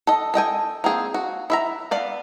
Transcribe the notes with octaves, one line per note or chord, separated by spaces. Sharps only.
A4 D#5
A4 D#5 G5 G#5
A#3 C4 G#4
F#4
E4 E5 A#5
B3 D5 F5